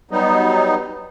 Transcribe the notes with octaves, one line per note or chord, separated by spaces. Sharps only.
F#3 G3 B3 D#4